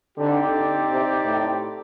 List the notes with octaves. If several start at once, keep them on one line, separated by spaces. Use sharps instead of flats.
D3 C4 D#4 G4 D5
C3
A2